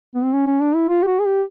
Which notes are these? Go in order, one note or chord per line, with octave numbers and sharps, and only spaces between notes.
B3
C4
C#4
C#4
D4
E4
F4
G4
F#4
G#4
G4